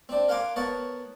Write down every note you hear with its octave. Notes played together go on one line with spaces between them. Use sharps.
C4 D4
A#4 F5 F#5 G#5 C6 D6
B3 A#4 C#5 F#5 A5